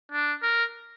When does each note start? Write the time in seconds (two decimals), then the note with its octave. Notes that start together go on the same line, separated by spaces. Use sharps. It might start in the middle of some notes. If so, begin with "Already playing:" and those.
0.12 D4
0.43 A#4